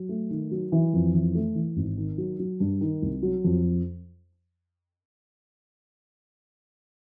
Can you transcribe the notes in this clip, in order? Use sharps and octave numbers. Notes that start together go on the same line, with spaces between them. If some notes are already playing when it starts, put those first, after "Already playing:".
Already playing: F#3
A3
D#3
F#3
E3
F2
E3
A3
E3
G#1
D#3
F#3
F#3
G2
D#3
C2
F#3
F2